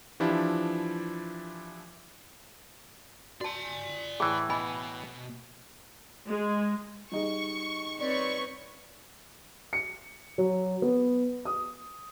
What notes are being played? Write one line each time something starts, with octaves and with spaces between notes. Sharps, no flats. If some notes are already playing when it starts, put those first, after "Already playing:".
E3 F3 D4 E4 F4 G4
F#4 D5 G#5 A5
A2 E3 G#4
B2 D#5 G#5 B5
G#3
G3 D#4 G#4 C#6
C4 B4 C#5 D5 C#6
C#7
F#3
B3
D#6